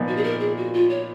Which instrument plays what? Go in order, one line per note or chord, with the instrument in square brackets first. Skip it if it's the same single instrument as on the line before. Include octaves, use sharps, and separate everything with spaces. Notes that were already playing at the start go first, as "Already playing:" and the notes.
Already playing: [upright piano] A#2 F3 B3 D#4
[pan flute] F#4
G#4
A#4
G#4
F#4
F4
C#5